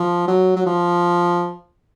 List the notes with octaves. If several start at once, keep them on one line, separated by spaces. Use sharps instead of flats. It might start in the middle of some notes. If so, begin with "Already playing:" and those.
Already playing: F3
F#3
F#3
F3